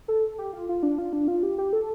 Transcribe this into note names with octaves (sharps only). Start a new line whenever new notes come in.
A4
G4
F4
F4
D4
F4
D4
F4
G4
G4
A4